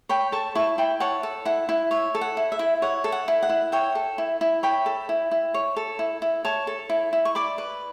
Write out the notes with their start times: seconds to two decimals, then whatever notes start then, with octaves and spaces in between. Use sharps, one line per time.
0.09 C#5 G5 B5
0.32 A4 A5 C#6
0.55 E4 A5 C#6
0.78 E4 G5 B5
1.00 C#5 F#5 A5
1.23 A4
1.45 E4 F#5
1.69 E4
1.91 C#5 E5
2.15 A4
2.21 F#5
2.37 E4
2.52 E5
2.59 E4
2.82 C#5 F#5
3.04 A4
3.12 F#5
3.28 E4
3.43 F#5
3.49 E4
3.72 C#5 E5 G5
3.95 A4
4.18 E4
4.41 E4
4.63 C#5 G5 B5
4.86 A4
5.09 E4
5.31 E4
5.54 C#5
5.76 A4
5.99 E4
6.22 E4
6.44 C#5 A5 C#6
6.67 A4
6.89 E4
7.13 E4
7.25 C#6
7.35 D5 B5 D6
7.58 B4